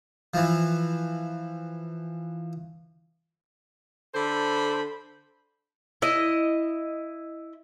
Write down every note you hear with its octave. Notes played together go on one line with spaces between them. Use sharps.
E3 F3
D3 A4 C5 B5
E4 D#5